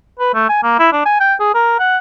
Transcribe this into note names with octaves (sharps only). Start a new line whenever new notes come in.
B4
A3
G#5
A#3
E4
D4
G#5
G5
G#4
A#4
F#5